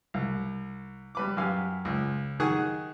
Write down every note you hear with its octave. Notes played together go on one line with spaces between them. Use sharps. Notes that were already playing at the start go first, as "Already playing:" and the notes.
C2
G3 B4 D6
F#2 G4 F5 G#5
C#2
D#3 G#4 F#5 C#6 D#6